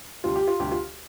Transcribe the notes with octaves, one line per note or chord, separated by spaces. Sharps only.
D2 C3 G3 F4
G4
F4
D2 C3 G3 G4
F4